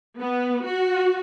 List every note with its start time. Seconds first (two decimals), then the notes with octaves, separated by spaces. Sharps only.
0.18 B3
0.67 F#4